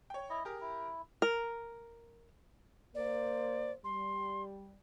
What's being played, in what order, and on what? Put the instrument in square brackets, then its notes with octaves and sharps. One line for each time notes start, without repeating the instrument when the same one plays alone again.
[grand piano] C#5 G5
[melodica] E4 D#5
[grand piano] G4 A#4 [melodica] G#4
[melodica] E4
[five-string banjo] A#4
[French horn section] A#3 C5 [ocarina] D5
[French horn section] G3 [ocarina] C6